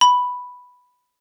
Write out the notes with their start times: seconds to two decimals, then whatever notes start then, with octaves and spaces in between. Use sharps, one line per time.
0.01 B5